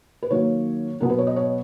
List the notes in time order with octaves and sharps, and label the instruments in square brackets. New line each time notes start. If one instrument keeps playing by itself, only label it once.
[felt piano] B4
D#3 F#3 A#3 C#5
B2 F#3 B3 A#4
B4
C#5
D#5
C#5